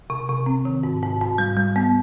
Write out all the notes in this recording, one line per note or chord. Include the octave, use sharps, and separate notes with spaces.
C3
C3
C4
D#3
G#2
G#2
G#2
G3
G3
B3